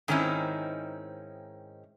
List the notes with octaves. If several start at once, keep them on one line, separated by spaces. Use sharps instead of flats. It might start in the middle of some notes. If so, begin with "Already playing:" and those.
G#2 D#3 C4 C#4 D#4 E4